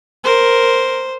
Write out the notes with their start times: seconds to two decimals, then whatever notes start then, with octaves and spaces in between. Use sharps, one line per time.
0.24 A#4 C5